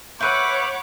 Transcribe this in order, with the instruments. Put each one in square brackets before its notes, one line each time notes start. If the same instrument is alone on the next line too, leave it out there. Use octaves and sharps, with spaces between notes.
[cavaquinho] B4 E5 [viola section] C#5 F#5 B5 [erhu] D6 [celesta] G6 D#7